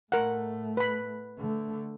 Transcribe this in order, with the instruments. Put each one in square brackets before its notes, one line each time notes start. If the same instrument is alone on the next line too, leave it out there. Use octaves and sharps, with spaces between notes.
[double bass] A2 A3 [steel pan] A#4 F#5
[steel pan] B4 B5
[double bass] D3 A3